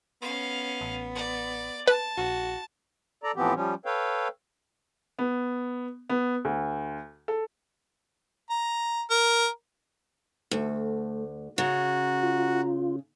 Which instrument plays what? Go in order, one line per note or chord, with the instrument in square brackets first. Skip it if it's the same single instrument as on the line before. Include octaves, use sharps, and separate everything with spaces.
[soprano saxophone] B3 [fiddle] C#4 F5
[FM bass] A1
[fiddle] D5
[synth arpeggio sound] B4 [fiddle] A5
[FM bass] A#1 [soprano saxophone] F#4
[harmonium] A4 D5 A#5
A2 E3 F3 B3 C4 G4
F3 G3 C#4
A4 B4 C#5 F5 G5
[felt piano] B3
B3
D2
A4
[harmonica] A#5
A#4
[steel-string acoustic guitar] D2 [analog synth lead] A3
[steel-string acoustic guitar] C#3 [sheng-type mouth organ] F#4 [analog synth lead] A#5
[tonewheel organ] F4